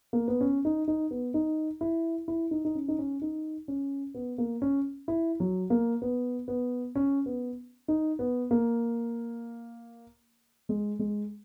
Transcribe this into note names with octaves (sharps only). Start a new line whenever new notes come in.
A#3
B3
C#4
D#4
D#4
B3
D#4
E4
E4
D#4
D#4
C#4
D#4
C#4
D#4
C#4
B3
A#3
C#4
E4
F#3
A#3
B3
B3
C#4
B3
D#4
B3
A#3
G#3
G#3